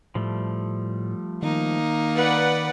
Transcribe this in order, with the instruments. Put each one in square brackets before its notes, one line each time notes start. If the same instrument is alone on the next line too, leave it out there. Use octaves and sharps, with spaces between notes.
[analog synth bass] A2 [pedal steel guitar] F3 G3 A3
[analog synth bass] D#3 [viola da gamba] A#3 D#4
[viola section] B4 D5 F#5